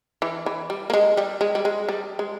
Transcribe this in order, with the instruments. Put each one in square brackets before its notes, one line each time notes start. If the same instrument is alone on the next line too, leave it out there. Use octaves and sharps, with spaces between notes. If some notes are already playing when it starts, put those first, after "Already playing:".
[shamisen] E3
E3
G3
A#3
G#3
G3
G#3
G3
G#3
G3
G#3